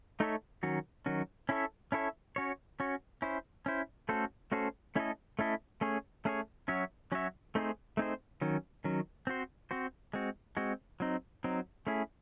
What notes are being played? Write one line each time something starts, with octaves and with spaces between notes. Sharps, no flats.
A3 D#4 A4 C#5 E5
D#3 F#3 C#4 F#4
D#3 F#3 C#4 F#4
C#4 E4 A4 C#5 E5
C#4 E4 A4 C#5 E5
C#4 F#4 C#5
C#4 F#4 C#5
C#4 E4 C5
C#4 E4 C5
A3 C#4 F#4 A4 C5
A3 C#4 F#4 A4 C5
A3 C#4 E4 A4 D#5
A3 C#4 E4 A4 D#5
A3 C#4 G#4 C#5
A3 C#4 G#4 C#5
F#3 C#4 F#4 C#5 E5
F#3 C#4 F#4 C#5 E5
A3 C4 D#4 G#4 C5
A3 C4 D#4 G#4 C5
D#3 F#3 C#4
D#3 F#3 C#4
C4 F#4 C5
C4 F#4 C5
G#3 C4 F#4
G#3 C4 F#4
F#3 C4 D#4
F#3 C4 D#4
A3 C#4 E4 G#4